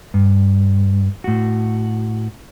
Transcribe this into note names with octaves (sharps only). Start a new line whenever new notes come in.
G2
A2 F#4